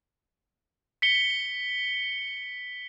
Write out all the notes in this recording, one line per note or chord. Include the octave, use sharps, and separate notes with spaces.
B6 C#7 G7